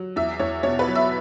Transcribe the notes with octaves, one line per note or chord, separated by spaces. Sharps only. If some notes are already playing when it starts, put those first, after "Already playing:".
Already playing: F#3
E2 E5
E2 C#5
B2 C#5
B4
F#3
E5